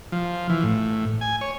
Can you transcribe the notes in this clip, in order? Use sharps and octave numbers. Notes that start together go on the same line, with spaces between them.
F3
E3
A2
G#5
C#5